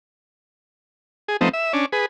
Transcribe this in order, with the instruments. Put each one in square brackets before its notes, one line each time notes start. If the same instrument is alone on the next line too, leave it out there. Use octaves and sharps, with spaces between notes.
[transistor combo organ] G#4
F3 A3 B3 C4 D#4
E5
C#4 D4
G#4 B4